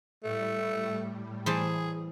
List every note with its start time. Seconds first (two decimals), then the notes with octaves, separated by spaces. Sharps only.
0.24 A2 G3 A3
1.46 E3 G#4 C5 A5